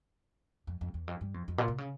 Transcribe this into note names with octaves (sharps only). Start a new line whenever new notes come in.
F2
F2
E2
F2
G2
F2
F2
A#2
C3
C#3